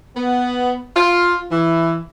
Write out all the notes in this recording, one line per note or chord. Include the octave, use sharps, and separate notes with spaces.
B3
F4
E3